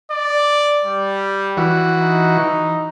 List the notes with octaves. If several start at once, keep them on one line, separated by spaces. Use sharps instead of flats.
D5
G3
E3 F#4
D#4